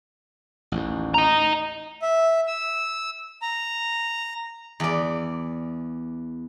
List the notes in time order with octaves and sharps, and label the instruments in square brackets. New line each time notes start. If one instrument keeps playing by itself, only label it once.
[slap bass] A1 D#2
[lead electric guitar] D#5 A#5
[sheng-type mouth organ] E5
E6
A#5
[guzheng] E2 D5